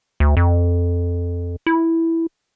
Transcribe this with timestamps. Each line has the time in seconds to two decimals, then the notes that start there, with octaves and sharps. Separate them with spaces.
0.20 D2
0.37 F2
1.66 E4